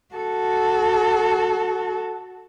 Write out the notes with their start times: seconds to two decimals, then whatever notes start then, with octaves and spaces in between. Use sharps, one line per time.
0.15 F#4 A4